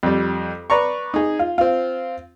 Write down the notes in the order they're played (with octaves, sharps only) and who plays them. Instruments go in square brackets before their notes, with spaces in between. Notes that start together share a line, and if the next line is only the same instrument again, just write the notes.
[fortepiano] F2 G3
B4 D5 A#5 C#6
D#4 G#4
F4
C4 F4